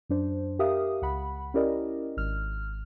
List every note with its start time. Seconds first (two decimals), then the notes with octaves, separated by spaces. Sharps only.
0.09 F#2 D4 C5
0.59 G4 A#4 E5 F5 D#6
1.02 C#2 F#5 B5
1.54 C#4 E4 G4 A#4 D5 D#5
2.17 G#1 F6